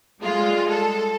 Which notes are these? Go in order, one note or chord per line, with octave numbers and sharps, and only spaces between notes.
G3 G#3 F4
A4